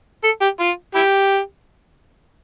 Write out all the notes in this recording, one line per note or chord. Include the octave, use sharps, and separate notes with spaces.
A4
G4
F4
E4 G4